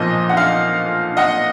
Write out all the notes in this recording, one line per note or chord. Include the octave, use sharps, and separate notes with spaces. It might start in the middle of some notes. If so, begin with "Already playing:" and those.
Already playing: B1 A#2 F3 D#5
F#5
F5
D#5 F#5